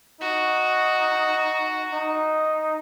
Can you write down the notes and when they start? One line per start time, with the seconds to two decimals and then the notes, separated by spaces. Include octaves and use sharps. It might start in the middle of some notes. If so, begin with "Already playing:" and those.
0.21 D#4 F#4
1.94 D#4